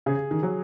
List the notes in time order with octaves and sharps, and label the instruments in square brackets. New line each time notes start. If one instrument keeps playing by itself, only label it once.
[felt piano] C#3 [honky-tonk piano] G#4
[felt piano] D#3
[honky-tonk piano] F#3